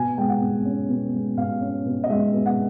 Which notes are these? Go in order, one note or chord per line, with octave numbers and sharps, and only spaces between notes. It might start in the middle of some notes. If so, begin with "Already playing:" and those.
Already playing: B2 G#5
G#3 G5
F#5
B2
C#4
B2
G#3
B2 F5
C#4
B2
D#5
G#3 E5
B2
F#5